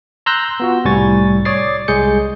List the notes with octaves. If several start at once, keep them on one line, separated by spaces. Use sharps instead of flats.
A#5 C6 E6 F#6 G6 A#6
B3 F4 F#4
C2 A2 G3 G#5 C#6 A6
C#5 D5 D6 D#6 A6 C7
C2 G#3 G#4 G6 C#7